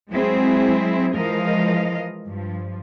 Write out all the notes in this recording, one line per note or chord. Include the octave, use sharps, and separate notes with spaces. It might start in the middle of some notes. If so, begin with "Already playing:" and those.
F#3 G#3 C4 E4 G#4
E3 F3 G#3 A#4 D#5 F5
G2 F3